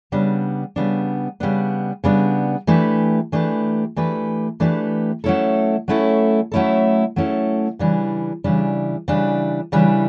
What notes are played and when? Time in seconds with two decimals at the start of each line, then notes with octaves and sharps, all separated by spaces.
0.12 C#3 G3 B3 D4
0.76 C#3 G3 B3 D4
1.40 C#3 G3 B3 D4
2.04 C#3 G3 B3 D4
2.67 E3 A3 D4 G4 B4
3.32 E3 A3 D4 G4 B4
3.96 E3 A3 D4 G4 B4
4.60 E3 A3 D4 G4 B4
5.24 F#3 A3 C#4 E4 A4
5.88 F#3 A3 C#4 E4 A4
6.52 F#3 A3 C#4 E4 A4
7.16 F#3 A3 C#4 E4 A4
7.79 C#3 E3 G3 D4
8.44 C#3 E3 G3 D4
9.08 C#3 E3 G3 D4
9.72 C#3 E3 G3 D4